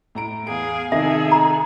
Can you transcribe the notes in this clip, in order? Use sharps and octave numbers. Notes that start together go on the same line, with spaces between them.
A2 A#5 D7
E2 G#4 F5 D7
C3 D#3 D#4 G#4 A4 E5
A#5